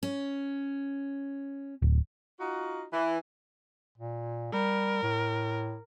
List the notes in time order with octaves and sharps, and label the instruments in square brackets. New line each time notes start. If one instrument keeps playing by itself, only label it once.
[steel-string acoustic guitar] C#4
[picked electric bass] D1
[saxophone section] D#4 F4 F#4
E3
[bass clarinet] A#2
[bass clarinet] G3 [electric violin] A#4
[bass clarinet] A2